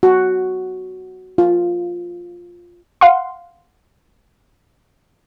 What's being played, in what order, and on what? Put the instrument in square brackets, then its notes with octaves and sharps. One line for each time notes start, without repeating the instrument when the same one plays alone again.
[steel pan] F#4
F4
[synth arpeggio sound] F5 F#5 C6